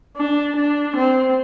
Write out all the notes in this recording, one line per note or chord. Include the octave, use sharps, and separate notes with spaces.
D4
D4
C4